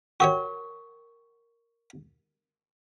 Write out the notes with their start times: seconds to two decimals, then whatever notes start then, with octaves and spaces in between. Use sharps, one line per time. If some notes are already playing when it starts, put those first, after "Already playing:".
0.20 F#4 G4 A#4 C#5 C#6